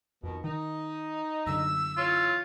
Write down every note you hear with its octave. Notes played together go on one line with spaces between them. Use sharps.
F2 B2 D#3
D#3 D#4
F#2 D3 E6
E2 F4 C#5